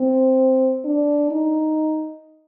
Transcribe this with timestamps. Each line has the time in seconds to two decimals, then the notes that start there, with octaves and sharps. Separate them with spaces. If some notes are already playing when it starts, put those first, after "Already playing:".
Already playing: C4
0.85 D4
1.31 D#4